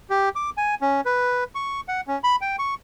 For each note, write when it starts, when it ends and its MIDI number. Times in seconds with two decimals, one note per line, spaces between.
0.10 0.29 67
0.36 0.50 86
0.57 0.75 80
0.82 1.01 61
1.06 1.44 71
1.55 1.81 85
1.88 2.01 78
2.08 2.19 61
2.24 2.36 83
2.41 2.56 79
2.59 2.75 85